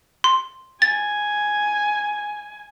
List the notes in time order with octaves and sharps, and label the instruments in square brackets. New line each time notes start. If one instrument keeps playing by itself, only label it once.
[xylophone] C6
[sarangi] G#5 [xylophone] A6